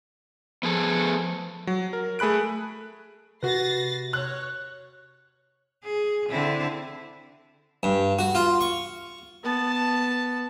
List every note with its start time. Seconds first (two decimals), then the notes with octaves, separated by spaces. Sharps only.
0.63 F3 B3 G#4 A4
1.67 F#3
1.93 A#4
2.19 A3 G#4 B5 F#6 D7
3.43 C3 F#4 B4 A6 A#6 C7
4.13 C#5 F#6
5.85 G#4
6.30 D3 C4 E4
7.83 G2
8.19 F#4
8.35 F4
8.61 C#6
9.44 B3 A5